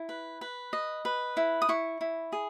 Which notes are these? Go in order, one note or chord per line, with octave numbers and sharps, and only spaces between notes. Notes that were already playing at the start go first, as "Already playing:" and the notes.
Already playing: E4
B4
B4
D#5
B4
E4
D#6
E4 C#6
E4
G#4